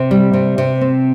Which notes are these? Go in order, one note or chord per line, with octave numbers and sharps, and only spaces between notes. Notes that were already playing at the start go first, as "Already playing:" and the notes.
Already playing: C3
G3
C3
C3
C4